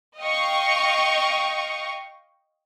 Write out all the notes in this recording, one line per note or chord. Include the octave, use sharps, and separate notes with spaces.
D#5 F5 G5 C#6